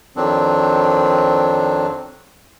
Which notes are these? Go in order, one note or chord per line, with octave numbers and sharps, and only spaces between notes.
F2 D#3 F#3 C4 D4